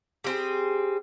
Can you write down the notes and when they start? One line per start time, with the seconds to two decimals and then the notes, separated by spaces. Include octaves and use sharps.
0.24 G3 C4 G#4